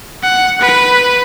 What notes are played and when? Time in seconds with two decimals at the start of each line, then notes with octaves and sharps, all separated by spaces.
0.23 F#5
0.61 B4